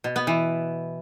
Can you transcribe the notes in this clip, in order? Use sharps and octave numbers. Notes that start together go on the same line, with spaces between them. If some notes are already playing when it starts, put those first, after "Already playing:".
B2
B3
E3